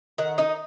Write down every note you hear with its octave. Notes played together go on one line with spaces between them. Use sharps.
D#3 F#5
D#4 D#5